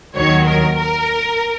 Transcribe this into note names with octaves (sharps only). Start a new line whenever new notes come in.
D#2 D#3 F#3 C#5
A#4
A#4